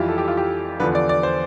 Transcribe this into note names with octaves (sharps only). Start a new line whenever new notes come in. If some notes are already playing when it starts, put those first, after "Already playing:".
Already playing: F2 E3 G3 E4 F4 G4
A4
G4
F4
G4
E2 D3 F3 B4
D5
D5
C5